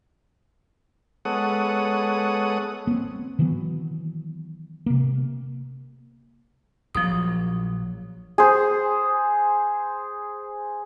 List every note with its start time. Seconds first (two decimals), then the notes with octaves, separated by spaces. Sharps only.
1.25 G#3 B3 A4 C#5 F#5 D#6
2.87 A#3 C4
3.39 D#3 E3 F#3 B3
4.86 C3 A#3
6.95 A#1 A#2 F3 F#3 D#6
8.38 G#4 C5